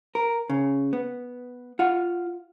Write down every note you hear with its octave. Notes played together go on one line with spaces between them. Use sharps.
A#4
C#3
B3
F4 F#5